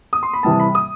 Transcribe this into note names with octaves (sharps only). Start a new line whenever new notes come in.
D#6
C6
B5
C3 E3 G3 A5
B5
D#6